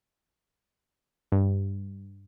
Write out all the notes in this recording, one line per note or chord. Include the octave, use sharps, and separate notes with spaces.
G2